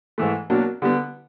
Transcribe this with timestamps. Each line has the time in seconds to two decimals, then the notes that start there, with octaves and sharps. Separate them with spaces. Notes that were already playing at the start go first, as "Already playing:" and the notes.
0.18 G#2 E3 A3
0.50 B2 F#3 A#3 D4
0.82 D3 G3 B3